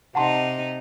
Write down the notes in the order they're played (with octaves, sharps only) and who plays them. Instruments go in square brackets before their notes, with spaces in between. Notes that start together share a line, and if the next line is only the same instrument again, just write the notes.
[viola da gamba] C3 D#4 [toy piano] F#5 A5 C6